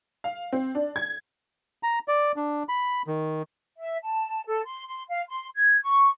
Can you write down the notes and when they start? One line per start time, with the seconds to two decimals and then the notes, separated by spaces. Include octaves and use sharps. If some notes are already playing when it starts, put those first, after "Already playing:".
0.24 F5
0.52 C4
0.75 D4
0.96 G#6
1.83 A#5
2.08 D5
2.36 D4
2.69 B5
3.08 D#3
3.77 E5
4.03 A5
4.46 A4
4.65 C6
4.87 C6
5.09 F5
5.28 C6
5.55 G#6
5.84 C#6